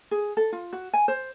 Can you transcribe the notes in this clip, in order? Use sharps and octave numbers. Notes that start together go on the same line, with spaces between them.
G#4
A4
F4
F#4
G#5
C5